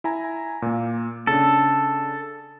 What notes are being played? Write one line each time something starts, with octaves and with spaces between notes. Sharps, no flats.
E4 G#5 A#5
A#2 A#3
C#3 D4 A4